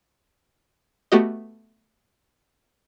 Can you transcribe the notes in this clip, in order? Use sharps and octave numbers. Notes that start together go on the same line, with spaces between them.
A3 B3 F#4 G4 D#5